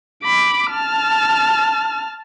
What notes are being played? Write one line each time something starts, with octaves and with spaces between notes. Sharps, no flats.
B5 D6
A5 F6